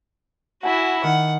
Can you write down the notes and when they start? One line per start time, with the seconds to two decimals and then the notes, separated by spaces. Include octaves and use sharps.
0.63 E4 F#4 F#5 G#5 B5
1.04 D#3 F#5